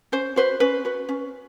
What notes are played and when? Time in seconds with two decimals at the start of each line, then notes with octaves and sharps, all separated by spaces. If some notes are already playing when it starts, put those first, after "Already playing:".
0.12 C#4 C5
0.36 F#4 B4 C5
0.60 C#4 B4
0.85 F#4 B4
1.09 C#4